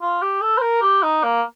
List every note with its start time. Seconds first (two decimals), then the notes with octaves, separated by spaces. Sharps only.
0.02 F4
0.22 G4
0.42 A4
0.58 C5
0.62 A#4
0.82 G4
1.03 D#4
1.23 A#3